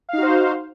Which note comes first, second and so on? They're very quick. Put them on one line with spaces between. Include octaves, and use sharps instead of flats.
F5 D#4 F#4 C5